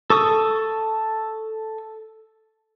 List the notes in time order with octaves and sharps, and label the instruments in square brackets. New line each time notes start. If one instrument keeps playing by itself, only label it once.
[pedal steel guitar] A4 C#6 D#6